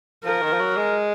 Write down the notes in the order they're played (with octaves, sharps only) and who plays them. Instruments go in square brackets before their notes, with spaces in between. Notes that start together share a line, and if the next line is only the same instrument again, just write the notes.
[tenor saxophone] F3 [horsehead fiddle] A#4
[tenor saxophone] D#3
F3
F#3
G#3